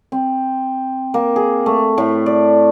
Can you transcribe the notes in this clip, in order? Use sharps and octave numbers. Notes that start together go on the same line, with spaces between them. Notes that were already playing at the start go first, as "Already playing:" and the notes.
C4
A#3
G#4
A3
A2
D5